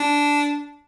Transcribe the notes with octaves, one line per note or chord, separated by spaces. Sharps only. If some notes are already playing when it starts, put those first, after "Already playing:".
Already playing: D4